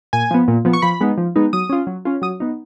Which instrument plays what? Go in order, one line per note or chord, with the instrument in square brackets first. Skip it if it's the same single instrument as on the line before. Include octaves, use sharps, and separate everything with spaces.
[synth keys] A#2 G#5
F3 B3
A#2
F3 B3
C#6
F3 B5
G#3 B3 D#4
F3
G#3 B3 D#4
F#3 D#6
C#4 F4
F#3
C#4 F4
F#3 D#6
B3 D#4